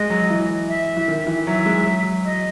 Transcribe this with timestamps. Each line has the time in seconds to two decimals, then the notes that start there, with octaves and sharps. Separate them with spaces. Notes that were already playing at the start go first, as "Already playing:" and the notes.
Already playing: G#3 D#5
0.10 F#3
0.22 F#3
0.30 E3
0.69 E5
0.97 E3
1.08 D#3
1.27 E3
1.47 F#3 E5
1.66 G#3
1.86 F#3
2.25 D#5